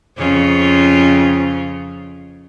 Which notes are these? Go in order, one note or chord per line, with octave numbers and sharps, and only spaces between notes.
F2 C#3 F4